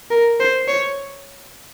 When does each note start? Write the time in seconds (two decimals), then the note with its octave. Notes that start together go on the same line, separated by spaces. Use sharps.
0.11 A#4
0.40 C5
0.68 C#5